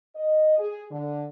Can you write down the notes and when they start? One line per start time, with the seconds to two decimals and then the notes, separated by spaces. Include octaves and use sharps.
0.16 D#5
0.58 G#4
0.91 D3